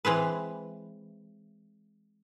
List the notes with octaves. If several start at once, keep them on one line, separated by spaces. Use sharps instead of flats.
E3 G#3 C4 B4